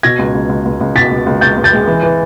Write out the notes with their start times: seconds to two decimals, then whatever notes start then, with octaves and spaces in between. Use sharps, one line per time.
0.03 B2 G#6 A#6
0.19 C#2
0.35 C#2
0.49 C#2
0.65 C#2
0.80 C#2
0.95 B2 A6 B6
1.11 C#2
1.26 C#2
1.41 C#2 G6 A6
1.57 C#2
1.64 G6 A6
1.73 G#3
1.87 E3
2.03 E3